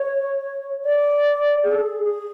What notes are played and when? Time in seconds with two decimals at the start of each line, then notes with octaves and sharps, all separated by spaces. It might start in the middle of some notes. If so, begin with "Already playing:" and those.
Already playing: C#5
0.84 D5
1.63 G#4
1.72 A4
1.80 G#4
2.03 G#4